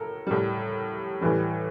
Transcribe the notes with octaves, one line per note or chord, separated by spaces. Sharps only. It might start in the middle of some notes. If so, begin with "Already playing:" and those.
Already playing: A2 A4 A#4
A2 G3
A2 E3 G3